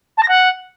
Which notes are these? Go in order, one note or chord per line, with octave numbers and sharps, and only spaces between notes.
A5
A#6
F#5